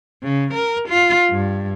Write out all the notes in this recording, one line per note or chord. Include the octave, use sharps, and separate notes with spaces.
C#3
A#4
F4
G2